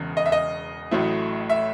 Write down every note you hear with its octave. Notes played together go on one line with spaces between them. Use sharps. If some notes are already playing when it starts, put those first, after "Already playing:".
Already playing: E1 E2 C#3
D#5
E5
D#5
A1 A2 F#3 A3 E4
E5